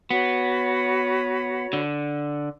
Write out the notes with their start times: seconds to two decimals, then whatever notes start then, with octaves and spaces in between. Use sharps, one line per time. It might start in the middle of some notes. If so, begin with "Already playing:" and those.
0.10 B3 F#4 C#5 B5
1.73 D3